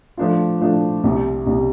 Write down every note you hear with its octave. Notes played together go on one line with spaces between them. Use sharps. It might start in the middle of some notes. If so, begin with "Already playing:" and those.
F3 A3 D4 F4
F3 A3 D4 F4
C2 C3 G3
C2 C3 G3